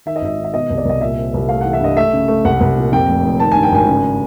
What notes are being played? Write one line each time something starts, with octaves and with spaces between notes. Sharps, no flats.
D#3 E5
D#5
G#1 E5
D#3
E5
B2 D#5
C2
D5
C2 D#5
A#2 E5
C4
C2
A3 F5
E3 F#5
E5
G2 D#5
A3 E5
C#3
A3
C2 F#5
C2
A#2
F2 G5
F1
F1
D#3 A5
G2 G#5
G5
G#1 G#5
C#3